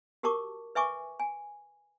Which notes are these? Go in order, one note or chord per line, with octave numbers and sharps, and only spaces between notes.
F#4 G4 A#4 A5 C#6 D6
B4 E5 G#5 C#6 D6
G#5